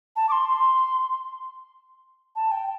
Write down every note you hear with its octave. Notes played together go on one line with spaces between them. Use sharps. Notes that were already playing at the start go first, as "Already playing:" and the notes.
A5
D6
C6
C6
A5
G5